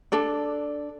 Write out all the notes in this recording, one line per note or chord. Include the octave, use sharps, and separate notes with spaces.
D4 A4 D5